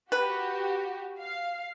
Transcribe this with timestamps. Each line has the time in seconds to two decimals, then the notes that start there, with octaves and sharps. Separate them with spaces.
0.12 F#4 G4 B4
1.19 F5